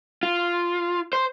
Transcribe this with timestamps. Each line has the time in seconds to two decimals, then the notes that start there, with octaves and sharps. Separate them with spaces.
0.23 F4
1.13 C5